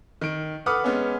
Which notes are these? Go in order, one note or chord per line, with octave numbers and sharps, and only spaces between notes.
D#3 D7
A4 B4 F#5 D6 D#6 F6
G#3 B3 C#4